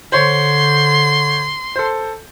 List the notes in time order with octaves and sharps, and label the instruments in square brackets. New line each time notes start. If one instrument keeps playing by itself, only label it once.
[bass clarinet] D3 [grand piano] C5 C#5 [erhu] C6
[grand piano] A4 C5